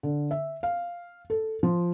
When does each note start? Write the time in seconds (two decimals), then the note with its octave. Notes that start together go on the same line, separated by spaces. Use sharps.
0.03 D3
0.31 E5
0.63 F5
1.30 A4
1.63 F3